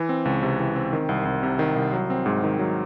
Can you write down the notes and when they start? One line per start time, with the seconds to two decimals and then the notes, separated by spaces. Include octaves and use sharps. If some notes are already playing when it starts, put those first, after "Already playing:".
Already playing: E3
0.09 C4
0.25 C#2
0.43 C3
0.59 E3
0.76 C4
0.93 D#3
1.09 C2
1.25 C2
1.43 C3
1.59 D#3
1.76 C2
1.93 F#3
2.10 C4
2.26 G#2
2.43 D#3
2.59 F#3